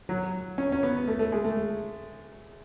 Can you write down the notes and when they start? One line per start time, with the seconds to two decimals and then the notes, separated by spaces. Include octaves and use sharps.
0.09 F#3
0.58 C#4
0.72 C#4
0.83 B3
1.08 A3
1.19 A3
1.32 G#3
1.45 A3